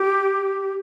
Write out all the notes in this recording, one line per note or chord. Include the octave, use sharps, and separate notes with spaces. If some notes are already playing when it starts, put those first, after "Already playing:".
Already playing: G4